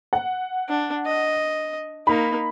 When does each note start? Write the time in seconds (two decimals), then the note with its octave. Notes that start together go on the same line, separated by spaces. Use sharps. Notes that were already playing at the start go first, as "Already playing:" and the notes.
0.13 F#5
0.69 D4
1.06 D#5
2.07 A#3 D#4 B5